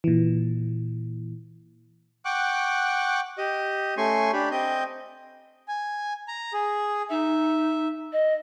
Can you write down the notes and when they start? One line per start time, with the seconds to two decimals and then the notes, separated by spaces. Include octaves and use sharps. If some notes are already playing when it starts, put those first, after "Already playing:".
0.04 A#2 E3
2.25 F#5 G5 C#6 D6 F#6
3.38 G4 D#5
3.97 A3 C#4 G#5 C6 C#6
4.33 D4 G4 B5
4.51 C4 D#5 G6
5.68 G#5
6.28 A#5
6.54 G#4
7.10 D#4 E5
8.13 D#5